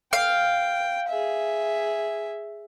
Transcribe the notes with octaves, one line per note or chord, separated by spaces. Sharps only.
F5 G5
G#4 E5